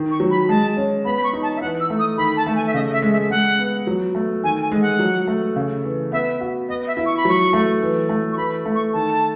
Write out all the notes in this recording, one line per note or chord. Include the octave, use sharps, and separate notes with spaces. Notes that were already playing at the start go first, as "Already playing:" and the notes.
Already playing: D#3
C#6
F#3
B5
G#3 A5
C#4
B3 B5
B5
C#6
D#4
A5
E5
E3 F#5
E6
A3
D#6
D#3 B5
A5
A3
G#5
E5
C#3 D#5
E5
G#3
E5
G#3 F#5
B3
F#3
A3
D#3 G#5
G#5
G#3
F#5
F#3
A3
C#3
E3
B3 E5
F#4
B3 D#5
E5
E4
C#6
B5
F#3 C#6
A3
E3
A3
C#6
E3 B5
A3
C#6
D#3 A5